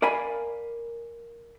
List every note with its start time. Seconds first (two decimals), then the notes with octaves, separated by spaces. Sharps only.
0.02 A#4 D5 F5 G#5 B5